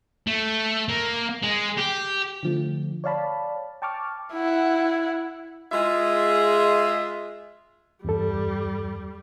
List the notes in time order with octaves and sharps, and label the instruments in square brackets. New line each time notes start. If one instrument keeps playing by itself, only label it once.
[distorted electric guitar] A3
A#3
G#3
G4
[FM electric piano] D3 F3 A3
C#5 D5 F5 A5 B5
G5 A5 C#6 D6 F6
[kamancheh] E4 F#5
[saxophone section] G#3 F4 G#4 D#5 E5
[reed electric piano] E2 G2 A4 [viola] G3